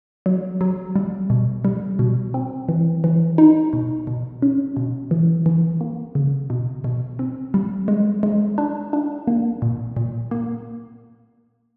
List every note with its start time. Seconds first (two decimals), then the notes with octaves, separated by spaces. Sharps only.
0.26 F#3
0.61 F#3
0.96 G3
1.30 B2
1.65 G3
1.99 B2
2.34 C4
2.69 E3
3.04 E3
3.38 D#4
3.73 B2
4.07 B2
4.42 C#4
4.77 B2
5.11 E3
5.46 E3
5.81 A#3
6.15 C#3
6.50 B2
6.84 B2
7.19 C4
7.54 G3
7.88 G#3
8.23 G#3
8.58 D4
8.93 D4
9.27 A#3
9.62 A#2
9.97 A#2
10.31 A#3